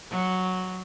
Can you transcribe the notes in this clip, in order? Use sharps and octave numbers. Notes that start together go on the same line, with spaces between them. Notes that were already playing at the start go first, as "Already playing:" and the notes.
F#3